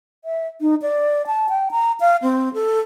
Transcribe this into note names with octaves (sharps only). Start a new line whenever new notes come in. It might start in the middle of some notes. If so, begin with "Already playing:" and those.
E5
D#4
D5
A5
G5
A#5
F5
C4
A4